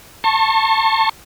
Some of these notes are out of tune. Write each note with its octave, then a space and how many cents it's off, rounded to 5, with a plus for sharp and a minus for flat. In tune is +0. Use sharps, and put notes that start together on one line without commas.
A5 +25 C#6 -35